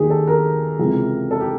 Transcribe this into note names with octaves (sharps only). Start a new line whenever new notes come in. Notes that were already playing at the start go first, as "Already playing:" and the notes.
Already playing: D#2 D#3 G4 G#4
A4
A#4
C#2 C3 E3
A4
G4